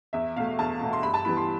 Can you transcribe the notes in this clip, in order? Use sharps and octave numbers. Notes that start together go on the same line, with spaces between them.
E2 E5
B2 A3 F5
E2 A5
B2 A3
C6
G2 B5
A5
E3 G3 B3 B5
C6